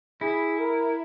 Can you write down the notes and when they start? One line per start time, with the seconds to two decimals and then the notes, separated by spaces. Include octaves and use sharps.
0.21 E4 G#4
0.59 A#4